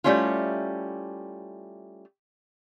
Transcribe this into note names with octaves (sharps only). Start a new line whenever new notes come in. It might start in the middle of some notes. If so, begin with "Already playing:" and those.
G3 A3 C#4 E4 F4